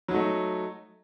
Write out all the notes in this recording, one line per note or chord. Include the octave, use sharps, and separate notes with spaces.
F#3 A3 D#4